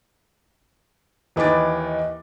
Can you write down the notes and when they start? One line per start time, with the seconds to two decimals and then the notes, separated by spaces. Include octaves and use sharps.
1.36 D#2 E3 D#4 B4 D6 A6